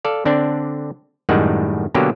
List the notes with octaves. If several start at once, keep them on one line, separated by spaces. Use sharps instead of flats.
A4 D5 F5
D3 C4 D4 D5
F#2 A2 D#3 G3 G#3 F#5
B2 D3 F#3 A#3 G4